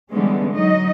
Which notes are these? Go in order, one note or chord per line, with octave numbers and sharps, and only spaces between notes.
D3 E3 G3 G#3 B3 C#4
F#3 D#4 D#5